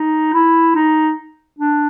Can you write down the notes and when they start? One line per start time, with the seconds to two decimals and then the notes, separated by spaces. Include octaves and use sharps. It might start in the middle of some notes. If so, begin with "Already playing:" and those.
Already playing: D#4
0.33 E4
0.75 D#4
1.59 D4